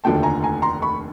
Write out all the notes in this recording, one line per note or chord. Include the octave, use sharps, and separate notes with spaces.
F1 D#2 D3 F3 A3 G5 A5
G#5 A#5
G#5 A#5
A#5 C6
B5 C#6